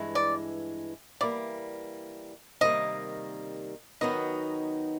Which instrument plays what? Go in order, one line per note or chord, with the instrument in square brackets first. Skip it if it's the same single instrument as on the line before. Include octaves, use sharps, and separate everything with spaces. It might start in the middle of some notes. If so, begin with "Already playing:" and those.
Already playing: [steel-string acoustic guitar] G2 E3 G#3
[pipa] D5
[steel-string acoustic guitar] E3 G3 A#3 [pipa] D5
[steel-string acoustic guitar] C3 D#3 G3 A#3 [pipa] D#5
[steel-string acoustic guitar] D#3 F#3 B3 D#4 F#4 [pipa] D#5